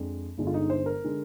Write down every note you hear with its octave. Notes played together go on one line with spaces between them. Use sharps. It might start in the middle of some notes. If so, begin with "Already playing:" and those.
Already playing: F2 G#3 D4
G1 G2 D3 G#3 D4
F4
D#4
C5
A#4
D3 G#3 D4